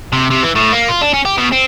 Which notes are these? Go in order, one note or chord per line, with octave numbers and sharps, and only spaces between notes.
C3
C3
E3
A2
A#3
F4
D4
C#4
G4
B2
C4